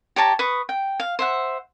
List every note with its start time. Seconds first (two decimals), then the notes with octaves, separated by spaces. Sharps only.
0.16 G4 C#5 A5 A#5
0.39 B4 C#6 D#6
0.69 G5
1.00 F5
1.19 C5 E5 F#5